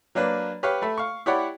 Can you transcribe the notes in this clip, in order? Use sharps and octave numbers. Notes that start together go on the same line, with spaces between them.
F#3 A#3 D4 B4
G4 B4 C#5 F5 B5
A3 E5 B5
F5 C#6
E4 G4 C#5 D5 F#5 B5